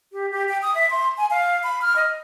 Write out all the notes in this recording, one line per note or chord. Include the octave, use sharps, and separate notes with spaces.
G4
G4
G5
D#6
E5
C6
G#5
F5
B5
F6
D#5